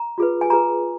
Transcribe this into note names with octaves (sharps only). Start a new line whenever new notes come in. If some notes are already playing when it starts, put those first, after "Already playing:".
Already playing: A#5
F4 G#4 B4
G#5
F4 G#4 B4 A#5